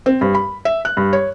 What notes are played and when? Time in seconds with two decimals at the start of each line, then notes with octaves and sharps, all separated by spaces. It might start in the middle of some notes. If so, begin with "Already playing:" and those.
0.06 C4
0.21 G2
0.35 B5
0.65 E5
0.85 F#6
0.97 G2
1.13 C#5